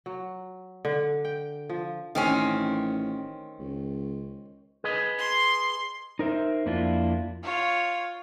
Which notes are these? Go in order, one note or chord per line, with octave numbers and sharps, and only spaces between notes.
F#3
D3
G5
F3
A1 D#3 C4 C#4
C#2
G#4 B4 D#5
C6
D#4 A#4 C5 E5
F2 A#3 D4 E4 F4
F4 C#5